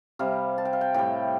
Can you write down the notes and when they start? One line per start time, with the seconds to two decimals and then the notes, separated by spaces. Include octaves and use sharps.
0.19 C3 G3 F5
0.58 A5
0.65 G5
0.73 F5
0.81 G5
0.94 A2 G3 G5